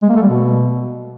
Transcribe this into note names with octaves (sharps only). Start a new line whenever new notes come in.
G#3
A#3
A3
G3
B2